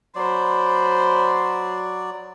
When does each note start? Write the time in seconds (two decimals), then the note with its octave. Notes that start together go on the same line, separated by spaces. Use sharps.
0.15 F#3 C5 D5 B5